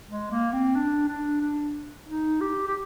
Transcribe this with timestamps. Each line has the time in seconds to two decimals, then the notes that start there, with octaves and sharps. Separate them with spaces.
0.09 G#3
0.31 A#3
0.53 C4
0.75 D4
1.08 D4
1.41 D4
2.08 D#4
2.41 G4
2.67 G4